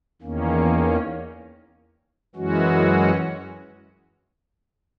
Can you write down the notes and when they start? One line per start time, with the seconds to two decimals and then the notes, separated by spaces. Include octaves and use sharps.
0.22 E2 D#3 A#3 C#4
2.36 F#2 E3 G#3 C#4 F#4